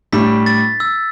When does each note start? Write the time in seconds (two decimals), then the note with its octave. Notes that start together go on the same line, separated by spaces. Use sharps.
0.13 A2 G3 D4 B6
0.46 A6
0.80 E6